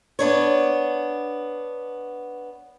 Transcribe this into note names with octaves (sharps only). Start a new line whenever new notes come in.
B3 D4 C#5